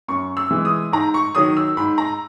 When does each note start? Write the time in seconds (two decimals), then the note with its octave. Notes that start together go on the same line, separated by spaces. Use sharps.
0.08 F#2 C#6
0.37 E6
0.51 E3 G#3
0.65 D#6
0.92 G#2 A#5
1.14 C#6
1.35 D#3 F#3 D#6
1.57 E6
1.77 G#2 B5
1.98 A#5